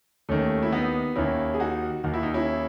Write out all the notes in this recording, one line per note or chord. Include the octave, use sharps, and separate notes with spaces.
D#2 D#3 A3 C#4
E4
B3 D#4
D#2 D#3 C#4 E4
G#4
D#4 F#4
D#2 D#3 F#4
E4
D#4
C#4 E4